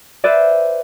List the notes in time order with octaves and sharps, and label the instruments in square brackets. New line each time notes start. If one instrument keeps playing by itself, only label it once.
[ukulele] B4 C5 D5 E5